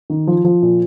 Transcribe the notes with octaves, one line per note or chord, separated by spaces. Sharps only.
D#3
F3
F3
A#2